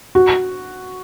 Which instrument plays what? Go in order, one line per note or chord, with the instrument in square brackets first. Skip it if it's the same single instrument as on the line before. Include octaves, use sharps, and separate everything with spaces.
[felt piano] F#4